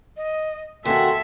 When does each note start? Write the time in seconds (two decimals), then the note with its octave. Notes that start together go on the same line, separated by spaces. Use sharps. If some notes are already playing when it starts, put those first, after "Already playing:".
0.17 D#5
0.85 D#2 C#4 F#4 A4 E5 C6